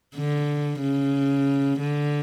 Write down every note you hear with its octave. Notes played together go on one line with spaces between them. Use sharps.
D3
C#3
D3